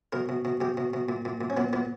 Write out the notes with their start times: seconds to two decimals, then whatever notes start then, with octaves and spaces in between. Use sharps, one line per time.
0.12 B2 A#4
0.29 B2
0.45 B2
0.60 B2 G4
0.77 B2
0.93 B2
1.09 A#2
1.25 A#2
1.41 A#2
1.50 C#4
1.57 A#2 B3
1.73 A#2 B3